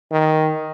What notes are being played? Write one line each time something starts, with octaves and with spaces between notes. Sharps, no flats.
D#3